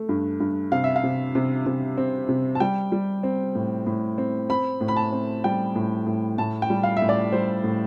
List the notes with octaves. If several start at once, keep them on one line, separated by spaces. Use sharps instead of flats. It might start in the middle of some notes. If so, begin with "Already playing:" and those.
Already playing: A3
G2
G2
C3 F5
E5
F5
C3
C3
C3
C4
C3
A5
G3 G5
G3
C4
A2
A2
C4
C4 B5
A2
B5
A5
C4
G3 G5
A2
A2
A2 A5
G5
G3
F5
E5
A2
D5
G3 C5
A2